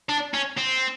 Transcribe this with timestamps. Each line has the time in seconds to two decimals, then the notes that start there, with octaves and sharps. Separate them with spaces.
0.09 D4
0.34 C#4
0.57 C4